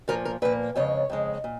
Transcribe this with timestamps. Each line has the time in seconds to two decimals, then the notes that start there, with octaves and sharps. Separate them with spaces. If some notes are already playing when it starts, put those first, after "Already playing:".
0.08 A#2 F3 A#3 A#4
0.25 A#4
0.42 A#2 F3 A#3 B4
0.76 F2 C#3 G#3 C#5
1.10 F2 C#3 G#3
1.44 A#2